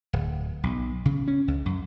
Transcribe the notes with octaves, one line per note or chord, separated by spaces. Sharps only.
D1
B1
C#3
C#4
C#2
F#2